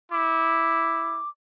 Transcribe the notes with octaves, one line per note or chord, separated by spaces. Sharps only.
E4 D6